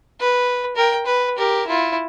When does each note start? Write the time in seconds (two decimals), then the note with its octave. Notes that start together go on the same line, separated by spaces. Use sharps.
0.20 B4
0.76 A#4 G5
1.06 B4
1.37 G4 A#4
1.67 E4 F4